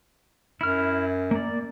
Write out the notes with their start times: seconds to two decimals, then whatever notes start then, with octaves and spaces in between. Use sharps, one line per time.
0.61 F#2 E4 F6
1.31 A#3 D5